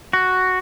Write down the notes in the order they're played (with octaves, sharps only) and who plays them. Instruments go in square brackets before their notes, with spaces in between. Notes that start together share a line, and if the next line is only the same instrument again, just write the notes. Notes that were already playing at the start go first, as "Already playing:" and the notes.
[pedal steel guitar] F#4